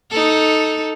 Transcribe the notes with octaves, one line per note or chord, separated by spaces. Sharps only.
D#4 A4